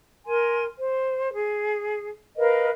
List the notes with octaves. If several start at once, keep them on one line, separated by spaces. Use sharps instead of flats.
A#4 G#5 C6
C5
G#4
A#4 B4 D#5 F5